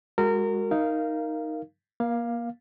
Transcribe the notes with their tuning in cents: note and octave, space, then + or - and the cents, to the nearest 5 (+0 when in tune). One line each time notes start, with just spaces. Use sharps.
G#3 -25 F#4 +0 A#4 -25
D#4 +0 A#4 +0 F5 -20
A#3 +30 F5 +0